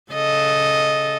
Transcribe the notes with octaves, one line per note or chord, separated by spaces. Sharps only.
C#3 A4 D#5